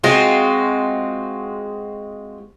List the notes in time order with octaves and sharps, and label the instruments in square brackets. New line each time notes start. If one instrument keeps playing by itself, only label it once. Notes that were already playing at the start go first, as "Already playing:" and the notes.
[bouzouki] G#3 C4 F4 F#4